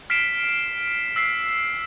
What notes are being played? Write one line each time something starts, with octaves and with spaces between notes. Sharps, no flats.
F6 B6 C7 D7 E7
E6 B6 C7